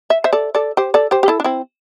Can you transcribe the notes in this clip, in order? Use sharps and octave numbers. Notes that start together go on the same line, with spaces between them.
E5
C5 E5
A4 D5
A4 D5
G4 C5
A4 D5
G4 C5
G4
E4 A4
D4
C4 E4